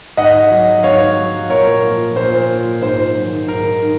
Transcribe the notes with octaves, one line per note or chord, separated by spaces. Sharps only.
G#2 D#5 F#5
F#3
G#2 C#5 F5
F#3
A#2 A#4 C#5
F3
A#2 C5
F3
G#2 C5
D#3 F#3
G#2 A#4
D#3